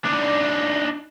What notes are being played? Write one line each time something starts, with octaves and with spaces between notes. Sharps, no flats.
D4 D#4